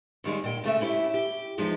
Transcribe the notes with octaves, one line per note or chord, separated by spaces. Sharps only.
D#2 D#3 G3 G#3
A#2 G5
C#3 A3 E5
C#4 E4 G4
G4
E2 F3 G#3 D#4